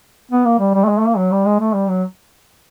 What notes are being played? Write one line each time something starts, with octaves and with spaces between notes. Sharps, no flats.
B3
A#3
G3
G3
A3
G#3
A3
A#3
F#3
G3
G#3
A3
G3
F#3